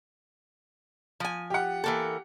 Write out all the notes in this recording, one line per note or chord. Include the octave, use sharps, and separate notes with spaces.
F3 G#5
G4 F#5
E3 A#3 A4